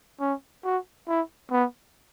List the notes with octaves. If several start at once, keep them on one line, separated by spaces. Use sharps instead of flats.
C#4
F#4
E4
B3